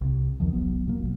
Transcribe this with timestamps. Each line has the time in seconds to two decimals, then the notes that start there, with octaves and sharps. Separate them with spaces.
0.01 C2 C3
0.40 B1 E2 D#3 F3
0.53 E1 B1 F#3 B3
0.88 B2 A#3
1.03 A#1 E3 F#3